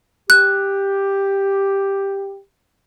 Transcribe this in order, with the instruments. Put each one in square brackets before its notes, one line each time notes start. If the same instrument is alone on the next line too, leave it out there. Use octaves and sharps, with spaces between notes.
[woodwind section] G4 [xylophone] F#6